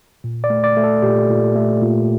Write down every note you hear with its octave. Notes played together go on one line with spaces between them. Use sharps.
A#2
D5
A3
D5
A3
A4
A#2 G4
A#2
A3
A#2